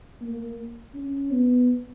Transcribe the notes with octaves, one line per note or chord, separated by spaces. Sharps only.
A#3
C#4
B3